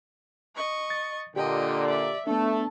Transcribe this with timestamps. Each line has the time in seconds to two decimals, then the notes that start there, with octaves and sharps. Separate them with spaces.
0.55 D#5 C#6
0.90 A6
1.36 A#2 D3 G4 D#5 G5
1.87 D5 E5
2.27 A3 B3 D4 A4 A5